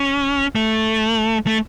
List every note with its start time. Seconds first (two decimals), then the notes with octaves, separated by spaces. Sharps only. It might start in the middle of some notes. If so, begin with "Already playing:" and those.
Already playing: C#4
0.55 A3
1.46 A3